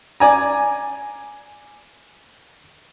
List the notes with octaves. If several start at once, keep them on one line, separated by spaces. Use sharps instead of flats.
D5 G#5 A#5